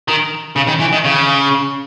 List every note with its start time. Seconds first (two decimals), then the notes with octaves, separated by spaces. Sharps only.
0.08 D#3
0.56 C#3
0.67 D#3
0.80 E3
0.93 D#3
1.05 C#3